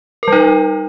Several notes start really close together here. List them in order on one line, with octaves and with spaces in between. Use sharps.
A#4 G3 D#4